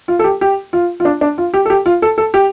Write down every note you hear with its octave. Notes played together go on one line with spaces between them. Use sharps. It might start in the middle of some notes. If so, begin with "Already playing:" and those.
F4
A4
G4
G4
F4
F4
D4
D4
F4
G4
A4
G4
F4
A4
A4
G4